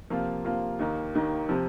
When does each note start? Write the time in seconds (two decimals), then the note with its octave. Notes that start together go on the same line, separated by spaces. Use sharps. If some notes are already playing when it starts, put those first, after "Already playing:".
0.10 C3 F3 A#3 F4
0.45 C3 F3 A#3 F4
0.79 D#2 D#3 A#3
1.15 D#2 D#3 A#3
1.49 C3 F3